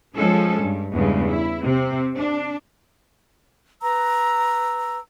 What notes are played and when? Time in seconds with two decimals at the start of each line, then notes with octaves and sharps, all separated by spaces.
0.17 F3 G#3 C#4 A4
0.61 G2
0.93 E2 G2 C#3 G#3
1.30 E4
1.63 C3 C4
2.17 D4
3.82 B4 A#5 E6